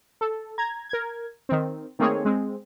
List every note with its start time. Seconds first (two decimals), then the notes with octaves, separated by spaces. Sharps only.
0.21 A4
0.58 A#5 G#6
0.89 A#4 G#6
1.49 D#3 C4
1.99 D#3 A3 A#3 C4 G#4 C#5
2.25 G#3 C4